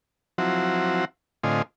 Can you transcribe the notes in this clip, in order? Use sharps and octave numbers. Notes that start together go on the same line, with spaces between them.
F3 F#3 C4 E4 F#4
A2 D3 C4 F4 D#5 G#5